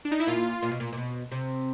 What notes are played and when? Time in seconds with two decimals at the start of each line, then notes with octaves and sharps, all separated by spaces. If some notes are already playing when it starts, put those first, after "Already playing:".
0.05 D4
0.11 D#4
0.20 E4
0.27 A#2 F4
0.62 A#2
0.71 B2
0.80 A#2
0.93 A#2
0.97 B2
1.31 C3